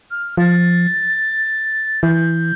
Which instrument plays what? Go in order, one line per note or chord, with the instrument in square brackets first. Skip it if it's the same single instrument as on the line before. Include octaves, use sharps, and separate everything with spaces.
[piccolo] F6
[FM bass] F3 [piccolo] A6
[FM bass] E3 [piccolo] G6